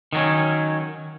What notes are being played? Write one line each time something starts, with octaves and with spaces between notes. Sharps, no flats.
D#3 F#3 C#4